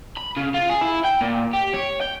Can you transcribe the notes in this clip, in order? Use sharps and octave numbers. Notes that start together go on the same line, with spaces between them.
B5
C#3
F4
G#4
E4
G5
A#2
G4
C#5
G5